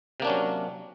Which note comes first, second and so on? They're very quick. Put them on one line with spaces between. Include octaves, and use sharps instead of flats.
C3 A#3 D4 C#4 F#3